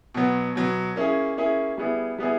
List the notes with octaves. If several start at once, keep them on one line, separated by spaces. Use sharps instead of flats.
B2 F#3 B3
B2 F#3 B3
A#3 C#4 E4 G#4
A#3 C#4 E4 G#4
G3 B3 E4 G#4
G3 B3 E4 G#4